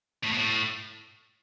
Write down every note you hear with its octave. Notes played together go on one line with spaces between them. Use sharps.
A2
B2
A2